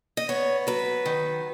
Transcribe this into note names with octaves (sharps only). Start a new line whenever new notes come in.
D#5
B3 C#5
F#3 B4
D#3